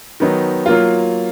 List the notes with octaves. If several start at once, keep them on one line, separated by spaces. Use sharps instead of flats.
D#3 F#3 B3 D#4
F#3 A#3 F4